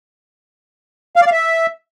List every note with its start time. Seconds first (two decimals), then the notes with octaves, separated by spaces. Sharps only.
1.16 F5
1.21 D5
1.27 F5
1.32 E5